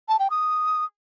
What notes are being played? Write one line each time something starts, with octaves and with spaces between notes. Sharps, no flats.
A5
G5
D#6